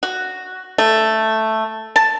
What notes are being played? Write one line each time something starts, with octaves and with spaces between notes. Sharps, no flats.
F#4
A3
A5